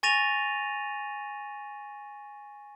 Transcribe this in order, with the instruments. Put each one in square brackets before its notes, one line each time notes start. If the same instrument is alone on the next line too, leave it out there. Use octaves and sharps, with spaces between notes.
[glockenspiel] G#5 C#6 A6 A#6 D#7 F7